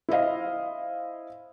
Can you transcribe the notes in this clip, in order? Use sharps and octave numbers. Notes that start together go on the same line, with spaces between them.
E4 C5 D#5 F5